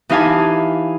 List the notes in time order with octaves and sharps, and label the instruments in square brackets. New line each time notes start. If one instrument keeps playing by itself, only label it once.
[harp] E3 D#4 G4 F5 G#5 A5